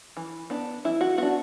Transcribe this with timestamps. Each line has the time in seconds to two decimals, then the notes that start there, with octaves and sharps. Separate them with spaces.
0.17 E3
0.50 B3 D4
0.84 E3 E4
1.01 F#4
1.18 B3 D4 F#4